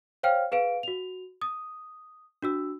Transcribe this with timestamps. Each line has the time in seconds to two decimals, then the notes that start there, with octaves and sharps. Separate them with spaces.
0.23 C5 C#5 F5 G5 F6
0.52 G#4 B4 F5 D7
0.83 F#4 F7
1.42 D#6
2.42 D4 F#4 E6